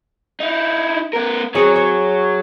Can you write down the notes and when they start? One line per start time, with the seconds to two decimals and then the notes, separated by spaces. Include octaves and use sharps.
0.40 D#4 E4
1.13 B3 A#4
1.55 F#3 C4 G#4 C#5
1.76 C#5